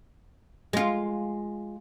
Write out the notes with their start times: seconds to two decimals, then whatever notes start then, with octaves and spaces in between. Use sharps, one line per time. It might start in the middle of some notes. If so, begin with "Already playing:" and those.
0.73 G#3 F4